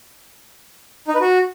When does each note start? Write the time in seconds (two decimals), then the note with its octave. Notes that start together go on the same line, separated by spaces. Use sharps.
1.08 D#4
1.14 B4
1.21 F#4